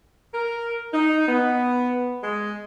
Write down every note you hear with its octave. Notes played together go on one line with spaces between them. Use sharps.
A#4
D#4
B3
G#3